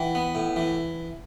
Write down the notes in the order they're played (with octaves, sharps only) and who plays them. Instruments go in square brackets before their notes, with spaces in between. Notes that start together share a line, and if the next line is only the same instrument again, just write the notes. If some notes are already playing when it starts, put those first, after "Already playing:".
Already playing: [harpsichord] E3 [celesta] F#5 G5
[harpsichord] B3
A2
E3